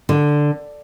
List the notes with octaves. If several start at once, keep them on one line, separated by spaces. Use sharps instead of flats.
D3